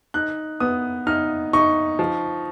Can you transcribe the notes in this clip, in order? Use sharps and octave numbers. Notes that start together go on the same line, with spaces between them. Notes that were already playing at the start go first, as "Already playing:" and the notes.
D#4 F#6
B3 D#6
D#4 F6
D#4 C#6
F3